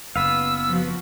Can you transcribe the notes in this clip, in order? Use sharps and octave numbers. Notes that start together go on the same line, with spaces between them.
F#1 B3 B4 F5 E6
F3 F#4